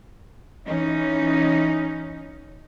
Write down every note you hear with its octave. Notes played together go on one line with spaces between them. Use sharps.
E3 C#4 D#4